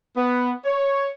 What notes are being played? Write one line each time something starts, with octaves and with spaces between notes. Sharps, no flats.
B3
C#5